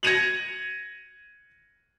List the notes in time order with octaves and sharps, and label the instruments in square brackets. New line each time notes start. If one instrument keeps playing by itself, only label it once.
[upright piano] G#6 A#6 C#7 D#7 F7 F#7